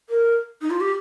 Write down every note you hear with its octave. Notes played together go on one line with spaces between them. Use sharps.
A#4
D#4
F4
G4